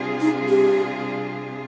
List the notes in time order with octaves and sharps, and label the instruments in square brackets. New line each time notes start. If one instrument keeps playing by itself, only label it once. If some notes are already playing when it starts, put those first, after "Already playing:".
Already playing: [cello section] C3 G3 D4 F4 G#4
[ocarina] D#4
G4